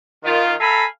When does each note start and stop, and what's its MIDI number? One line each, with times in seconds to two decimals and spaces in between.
0.24 0.54 51
0.24 0.54 65
0.60 0.84 69
0.60 0.84 76
0.60 0.84 77
0.60 0.84 80
0.60 0.84 82
0.60 0.84 83